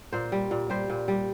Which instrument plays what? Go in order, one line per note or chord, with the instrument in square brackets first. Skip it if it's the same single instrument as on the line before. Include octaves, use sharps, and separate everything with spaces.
[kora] A#2 C5
G3
A#2
G3 C5
A#2
G3